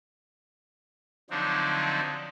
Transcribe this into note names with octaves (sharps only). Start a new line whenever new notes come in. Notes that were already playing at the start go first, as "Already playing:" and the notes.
D3 F3 F#3 C4 D4 D#4